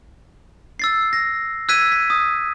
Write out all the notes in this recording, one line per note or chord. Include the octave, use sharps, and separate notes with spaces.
E6 A6 C7
A#6
E6 F#6 G#6 B6 D#7
B6
D#6